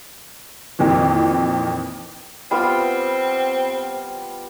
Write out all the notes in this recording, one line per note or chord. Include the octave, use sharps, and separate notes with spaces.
F2 A#2 D#3 E3
G3 B3 C4 F4